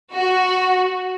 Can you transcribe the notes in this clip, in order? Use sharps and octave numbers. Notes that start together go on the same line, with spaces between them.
F#4